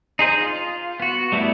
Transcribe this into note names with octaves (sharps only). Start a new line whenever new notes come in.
D#4 G#4 C5
F4
B3 F#4
G3 A3 B3 E4